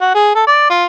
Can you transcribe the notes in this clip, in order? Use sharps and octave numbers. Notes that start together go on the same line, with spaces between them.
F#4
G#4
A4
D5
F4